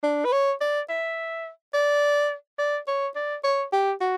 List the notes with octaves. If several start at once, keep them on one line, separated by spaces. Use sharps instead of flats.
D4
B4
C#5
D5
E5
D5
D5
C#5
D5
C#5
G4
F#4